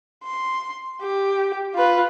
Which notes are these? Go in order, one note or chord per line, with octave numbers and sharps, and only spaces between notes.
C6
G4
F4 B4